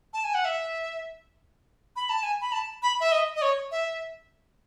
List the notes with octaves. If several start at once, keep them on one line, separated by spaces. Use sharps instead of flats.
A5
G#5
F#5
E5
B5
A5
G#5
B5
A5
B5
E5
D#5
D#5
C#5
E5